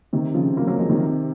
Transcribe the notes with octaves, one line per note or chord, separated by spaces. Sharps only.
C3 D#3
C#3 F3
F#3 A#3
F#3 A#3
F3 G#3
C3 D#3